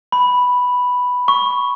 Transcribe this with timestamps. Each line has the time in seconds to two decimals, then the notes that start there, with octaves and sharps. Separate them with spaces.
0.12 B5
1.28 C#6